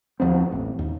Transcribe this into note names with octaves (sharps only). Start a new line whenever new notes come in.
D#2 F3 B3 C4
A1
D#2